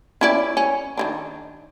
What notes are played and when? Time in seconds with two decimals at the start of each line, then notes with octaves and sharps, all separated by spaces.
0.21 C#4 E4 D5
0.57 C#4
0.97 D#3 E3 D4